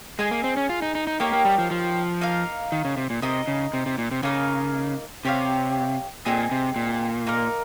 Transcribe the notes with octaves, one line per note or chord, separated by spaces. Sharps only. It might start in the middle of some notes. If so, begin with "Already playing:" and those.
G#3 G#4 D#5 G#5
A#3
C4
C#4
F4
D#4
D#4
D#4
A#3 D#4 G4 A#4 C#5
A#3
G3
F3
F3
A#3 D#4 A#4 F5
D#3
C#3
C3
A#2
C3 D#4 A#4 D#5
C#3
C3
C3
A#2
C3
C#3 A#3 D#4 A#4
C3 G4 C#5 F5
A#2 C4 D#4 G#4
C3
A#2
A#3 D#4 A#4